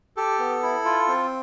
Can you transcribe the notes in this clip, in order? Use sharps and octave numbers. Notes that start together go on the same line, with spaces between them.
G4 A4
B3
E4
F4
C4